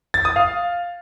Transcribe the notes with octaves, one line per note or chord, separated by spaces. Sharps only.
A6
D#6
F5